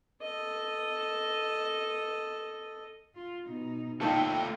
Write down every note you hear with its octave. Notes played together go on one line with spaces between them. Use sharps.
A4 D#5
F4
B2 D#4
D#2 A3 D#4 F4 A4 G5